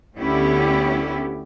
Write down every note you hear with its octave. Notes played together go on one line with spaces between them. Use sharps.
D2 D3 B3 C#4 E4 G4